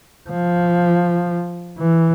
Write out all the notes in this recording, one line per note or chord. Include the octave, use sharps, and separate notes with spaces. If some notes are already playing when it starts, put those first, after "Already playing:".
F3
E3